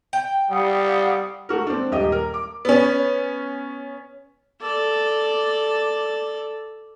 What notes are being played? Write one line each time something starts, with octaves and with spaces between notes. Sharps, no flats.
G5
G3 F5 F#5 D#6
A3 F#4 A#4
C4 D4
D#1 G4 D#5
A#4
D6
B3 C#4
A4 D5